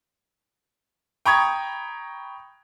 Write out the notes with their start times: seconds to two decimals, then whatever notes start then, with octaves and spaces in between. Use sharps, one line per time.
1.25 G5 A#5 B5 C#6 D#6 G#6